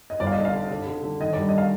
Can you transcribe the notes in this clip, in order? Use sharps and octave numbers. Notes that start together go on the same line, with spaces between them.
D#5
G1 D5
F5
D#5
D3
F5
D3
D3
D3
D3
D#3 D#5
D5
G2
D#5
F5